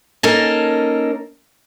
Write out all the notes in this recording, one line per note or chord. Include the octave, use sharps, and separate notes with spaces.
A#3 C#4 D#4 A4 A#4